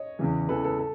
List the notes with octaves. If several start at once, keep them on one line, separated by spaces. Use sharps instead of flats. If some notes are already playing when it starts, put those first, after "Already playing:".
Already playing: C#5 D#5
E2 C#3 E3
E2 C#3 E3 A4 B4
A4 B4
A4